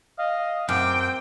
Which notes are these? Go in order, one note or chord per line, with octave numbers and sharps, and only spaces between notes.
D#5 F5
F#2 C4 G5 D6